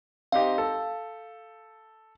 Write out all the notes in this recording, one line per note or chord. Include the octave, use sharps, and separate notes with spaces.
C4 D#4 G4 F5
A4